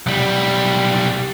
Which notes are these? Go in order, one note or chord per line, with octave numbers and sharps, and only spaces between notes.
B1 G3